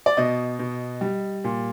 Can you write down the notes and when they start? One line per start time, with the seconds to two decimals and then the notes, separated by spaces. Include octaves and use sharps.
0.06 D5
0.17 B2 D#5
0.59 B2
1.01 G3
1.44 A#2